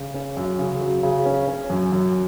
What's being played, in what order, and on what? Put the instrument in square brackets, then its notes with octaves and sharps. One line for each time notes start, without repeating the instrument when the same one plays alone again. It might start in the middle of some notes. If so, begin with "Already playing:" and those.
Already playing: [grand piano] C#3
C#4
F#2
C#3
F#3
C#3
C#4
C#4
F#2
F#2